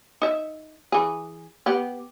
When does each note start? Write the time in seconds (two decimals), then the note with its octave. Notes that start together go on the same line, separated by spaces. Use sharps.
0.22 D#4 E5
0.92 E3 G#4
1.66 B3 G4